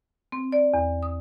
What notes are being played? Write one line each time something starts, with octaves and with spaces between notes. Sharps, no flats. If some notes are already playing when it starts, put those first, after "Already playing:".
C4
D5
E2
D#6